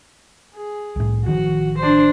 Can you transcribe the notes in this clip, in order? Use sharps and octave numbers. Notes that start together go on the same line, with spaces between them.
G#4
C2 A2
A1 D#3 F3 F#4
D4 C5